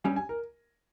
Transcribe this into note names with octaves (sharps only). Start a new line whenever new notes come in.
G2 G3 C#4 G#5
G#5
A#4